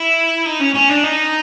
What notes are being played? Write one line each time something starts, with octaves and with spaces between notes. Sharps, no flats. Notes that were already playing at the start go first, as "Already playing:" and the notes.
Already playing: E4
D#4
C#4
C#4
D4
D#4